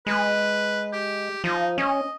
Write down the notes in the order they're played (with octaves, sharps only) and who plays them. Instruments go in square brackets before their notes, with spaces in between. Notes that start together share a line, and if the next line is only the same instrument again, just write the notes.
[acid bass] G#3 [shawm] B4
[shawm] G4
[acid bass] F3 [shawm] D#4
[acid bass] C#4 [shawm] D#5